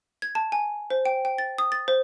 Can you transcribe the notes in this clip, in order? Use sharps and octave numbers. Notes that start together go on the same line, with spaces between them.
G#6
A5
G#5
C5
G5
G5
A6
D#6
A6
C5